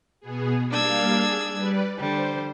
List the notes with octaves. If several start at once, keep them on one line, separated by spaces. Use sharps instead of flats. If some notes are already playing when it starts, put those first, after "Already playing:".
B2 B3 G#4
G3 A#3 D4 F5 E6 G#6
G#4
G3 B4 D5
D3 G3 C5